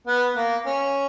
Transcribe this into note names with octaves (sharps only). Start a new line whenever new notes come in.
B3
A#3
C#4